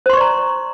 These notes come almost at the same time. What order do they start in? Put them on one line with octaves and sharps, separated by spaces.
C5 C6 C#6 D5 A#5